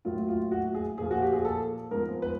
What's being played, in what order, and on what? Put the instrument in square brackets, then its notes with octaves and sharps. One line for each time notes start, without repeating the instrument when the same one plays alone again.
[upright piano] A2 F#3 A#3 F4
F4
F#4
G#4
A#2 F3 A#3 G#4
F#4
G4
G#4
A4
G#2 F3 G#3 B3 A#4
B4